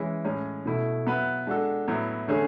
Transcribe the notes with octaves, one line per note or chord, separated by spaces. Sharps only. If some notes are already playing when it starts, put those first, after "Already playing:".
Already playing: E3 G#3 C#4 E4
A2 G#3 C#4
B2 A3 E4
F#3 B3 F#4 B4 E5
G#3 D4 F#4 A4
A2 F#3 B3 E4
D3 A3 C#4 G#4